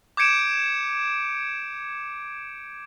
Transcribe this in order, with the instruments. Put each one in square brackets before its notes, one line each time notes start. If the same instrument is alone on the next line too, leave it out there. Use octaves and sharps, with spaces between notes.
[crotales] D6 G6 G#6 C#7 D7 E7